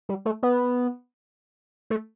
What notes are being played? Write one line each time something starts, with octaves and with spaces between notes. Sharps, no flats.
G3
A3
B3
A3